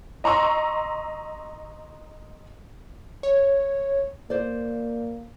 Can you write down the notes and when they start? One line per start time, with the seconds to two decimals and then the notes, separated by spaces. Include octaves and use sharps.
0.24 D#5 A#5 C6 C#6 E6
3.23 C#5
4.30 A#3 C5 D5